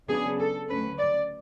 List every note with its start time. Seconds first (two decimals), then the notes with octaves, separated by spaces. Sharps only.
0.09 C#3 F#3 B3 D4 G#4
0.40 A4
0.69 D2 C#3 F#3 C#4 B4
0.99 D5